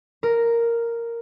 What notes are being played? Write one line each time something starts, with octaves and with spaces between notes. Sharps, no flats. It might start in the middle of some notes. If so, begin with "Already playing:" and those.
A#4